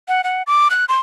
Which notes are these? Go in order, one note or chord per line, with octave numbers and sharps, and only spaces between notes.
F#5
F#5
D6
F#6
C6